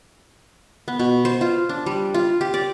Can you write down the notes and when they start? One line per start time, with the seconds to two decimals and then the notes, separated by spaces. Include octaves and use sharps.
0.88 B3
1.00 B2
1.25 C5
1.41 F4
1.69 D4
1.86 G3
2.14 F4
2.41 G4
2.54 D5